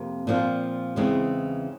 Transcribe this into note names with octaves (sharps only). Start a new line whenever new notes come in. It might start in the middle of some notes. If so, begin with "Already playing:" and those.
Already playing: F2 C3 A#3
A#2 F3 C4 F4
E2 C#3 E3 G#3 C4